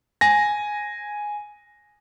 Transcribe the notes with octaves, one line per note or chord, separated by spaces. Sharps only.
G#5 A#6